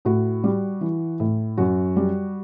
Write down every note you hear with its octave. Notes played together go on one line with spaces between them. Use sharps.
A2 F#4
G3
E3
A2
F#2 F#4
G3